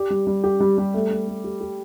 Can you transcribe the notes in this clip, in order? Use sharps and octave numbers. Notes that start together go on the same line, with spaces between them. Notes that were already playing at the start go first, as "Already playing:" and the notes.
Already playing: G4 D5
G3
G3
G4
G3
G3
A3
A3
A3
G4
G4